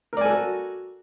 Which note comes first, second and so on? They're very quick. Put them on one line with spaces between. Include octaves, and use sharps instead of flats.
A#4 D5 G#5 A4 F#4